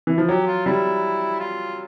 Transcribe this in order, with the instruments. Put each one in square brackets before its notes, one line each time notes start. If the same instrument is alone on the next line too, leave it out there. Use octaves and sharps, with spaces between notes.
[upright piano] E3
F3
[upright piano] F#3 [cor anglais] G4
[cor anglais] F4
[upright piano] G3 [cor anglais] E4
[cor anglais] F4